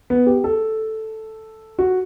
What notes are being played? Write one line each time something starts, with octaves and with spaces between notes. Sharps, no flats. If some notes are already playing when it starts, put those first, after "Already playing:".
B3
G4
A4
F#4